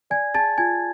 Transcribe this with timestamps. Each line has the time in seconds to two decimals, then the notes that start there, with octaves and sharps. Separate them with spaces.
0.10 D5 G#5 G#6
0.34 G#4 A5 A6
0.58 F4 G#5 G#6